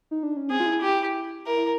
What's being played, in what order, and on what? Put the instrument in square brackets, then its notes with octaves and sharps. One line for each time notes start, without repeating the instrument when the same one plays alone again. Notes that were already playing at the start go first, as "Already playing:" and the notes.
[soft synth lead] D#4
D4
C#4
[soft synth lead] C4 [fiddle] G#4
[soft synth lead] F4
E4
[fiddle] G4
[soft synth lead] E4 [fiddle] A#4
[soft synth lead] E4